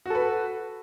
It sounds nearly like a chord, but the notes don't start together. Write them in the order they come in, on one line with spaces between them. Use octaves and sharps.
F#4 A4 B4